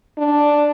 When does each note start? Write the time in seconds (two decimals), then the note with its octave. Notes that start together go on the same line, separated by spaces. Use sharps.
0.18 D4